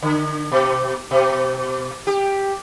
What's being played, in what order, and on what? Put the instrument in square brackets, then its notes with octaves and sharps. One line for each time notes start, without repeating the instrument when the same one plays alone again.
[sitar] D3
B2
B2
G4